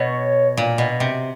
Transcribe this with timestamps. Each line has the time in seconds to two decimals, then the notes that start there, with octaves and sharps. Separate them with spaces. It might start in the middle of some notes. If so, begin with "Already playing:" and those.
Already playing: B2 C#5
0.57 A#2
0.78 B2
1.00 C3